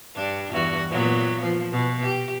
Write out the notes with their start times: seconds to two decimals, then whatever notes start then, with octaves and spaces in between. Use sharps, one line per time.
0.16 G2 D4
0.52 E2 G2 F#4
0.89 A#2 F#3 B3
1.41 F3
1.72 B2
2.02 G4